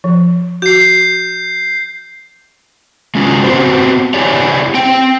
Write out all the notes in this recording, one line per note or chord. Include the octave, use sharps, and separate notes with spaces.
F3
F#4 G6 C7
G#3 A3 C#4 D#4 F4 F#4
B3 C4 F#4 G4 C5
E4 G4 G#4 C#5 D5
C4 G5